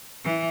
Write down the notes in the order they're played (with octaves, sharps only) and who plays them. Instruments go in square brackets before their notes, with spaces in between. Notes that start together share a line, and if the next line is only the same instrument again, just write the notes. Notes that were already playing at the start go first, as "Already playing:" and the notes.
[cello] E3